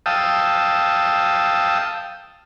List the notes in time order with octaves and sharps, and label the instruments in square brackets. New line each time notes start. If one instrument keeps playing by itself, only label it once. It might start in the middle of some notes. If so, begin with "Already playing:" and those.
[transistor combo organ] F5 G5 A5 D#6 E6